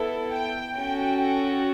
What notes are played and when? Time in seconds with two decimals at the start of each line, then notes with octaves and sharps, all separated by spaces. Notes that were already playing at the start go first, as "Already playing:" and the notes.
Already playing: B3 E4 A4
0.32 G5
0.75 C#4 F#4 A4 G5
1.19 G5